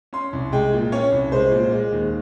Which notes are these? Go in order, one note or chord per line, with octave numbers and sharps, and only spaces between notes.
C#4 C6
C2
G#3 G5
A#2
C#4 C#5
C2
G#3 C5
A#2
G#3
D#2